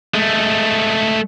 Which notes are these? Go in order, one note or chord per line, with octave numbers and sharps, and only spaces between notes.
G#3 A3